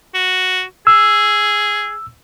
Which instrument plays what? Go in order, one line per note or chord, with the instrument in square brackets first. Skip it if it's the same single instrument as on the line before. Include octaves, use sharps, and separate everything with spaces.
[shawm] F#4
[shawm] G#4 [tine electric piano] E6